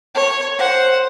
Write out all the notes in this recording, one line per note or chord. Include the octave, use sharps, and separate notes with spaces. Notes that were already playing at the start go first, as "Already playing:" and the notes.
C#5
C5 F#5